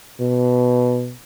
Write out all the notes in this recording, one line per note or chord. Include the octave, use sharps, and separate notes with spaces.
B2